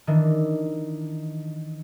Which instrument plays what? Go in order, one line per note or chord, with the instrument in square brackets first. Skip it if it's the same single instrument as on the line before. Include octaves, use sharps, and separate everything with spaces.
[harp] D#3 E3 D4